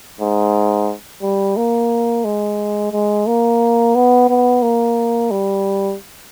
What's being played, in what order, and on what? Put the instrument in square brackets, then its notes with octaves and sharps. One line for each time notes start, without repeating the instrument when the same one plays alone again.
[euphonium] G#2
G3
A#3
G#3
G#3
A#3
B3
B3
A#3
G3